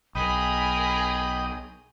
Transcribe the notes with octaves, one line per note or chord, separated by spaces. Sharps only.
B1 G#4 A#4 D#5 G5 B5 D#6